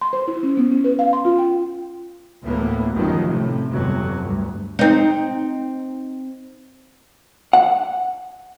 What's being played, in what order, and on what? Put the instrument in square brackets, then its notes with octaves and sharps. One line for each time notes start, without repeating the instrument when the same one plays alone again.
[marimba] C6
C5
E4
C#4
B3
C#4
B4
F5
C6
F4
G5
[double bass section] D2 A2 E3 A#3 B3
A1 F#2 D#3 F3 F#3
A2 C3
G1 F2 C3 F#3
D2 G2
[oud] C4 D#4
[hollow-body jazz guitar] F#5